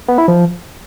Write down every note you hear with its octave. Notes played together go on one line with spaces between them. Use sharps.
B3
E4
F3